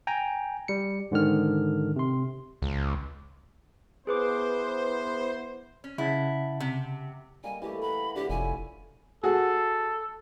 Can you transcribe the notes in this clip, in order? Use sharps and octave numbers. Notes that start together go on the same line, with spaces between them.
G5 G#5 A#5
G3 C#7
G#2 D3 D#3 F6
C3 C6
C#2
B3 E4 G#4 B4 C5 D6
C#4
C#3 E4 F#5 A5
C3
G3 A#3 D#5 G#5
E3 A3 G4
F#5 A#5 B5
A2 D3 G4
F1 E4 F4 C#5 G#5
F#4 G#4 A4